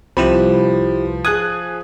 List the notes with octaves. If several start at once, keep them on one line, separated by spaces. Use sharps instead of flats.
C2 F3 E4 G4 B4 C5 B5 E7
G#4 D#6 F#6 G#6